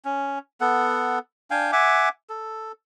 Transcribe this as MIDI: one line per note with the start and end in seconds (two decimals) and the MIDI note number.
0.05 0.39 61
0.61 1.19 59
0.61 1.19 69
0.61 1.19 78
1.51 1.71 62
1.51 1.71 77
1.51 1.71 79
1.51 1.71 80
1.72 2.09 76
1.72 2.09 78
1.72 2.09 80
1.72 2.09 86
2.30 2.72 69